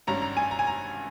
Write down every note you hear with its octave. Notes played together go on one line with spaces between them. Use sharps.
G#1 G2 G3 C#4 A#5
A#5
G#5
A#5
G#5
A#5